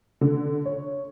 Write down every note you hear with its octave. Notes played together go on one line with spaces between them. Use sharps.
D3
C#5